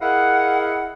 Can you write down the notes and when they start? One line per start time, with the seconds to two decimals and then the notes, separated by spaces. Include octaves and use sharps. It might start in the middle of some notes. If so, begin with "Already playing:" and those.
0.01 E4 G#4 A#4 D#5 F5 F#5